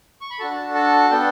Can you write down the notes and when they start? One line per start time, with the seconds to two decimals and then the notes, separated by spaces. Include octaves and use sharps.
0.21 C#6
0.30 B5
0.39 D4 F#4 A4 A5
0.75 A5
1.11 B3 D4 A4 G5